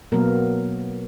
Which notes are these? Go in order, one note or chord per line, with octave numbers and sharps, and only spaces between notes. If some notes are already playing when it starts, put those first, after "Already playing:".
B2 F#3 A#3 B3 A#4